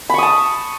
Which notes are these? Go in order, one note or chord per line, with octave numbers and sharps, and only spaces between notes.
A5 B5 C#6 D#6